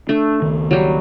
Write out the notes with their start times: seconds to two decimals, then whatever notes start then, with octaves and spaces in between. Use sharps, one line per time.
0.09 A3 D4
0.42 C#2 D#3
0.71 F#3 G3